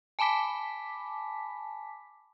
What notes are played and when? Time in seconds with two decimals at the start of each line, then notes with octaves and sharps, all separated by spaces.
0.19 G#5 A5 B5 D6 B6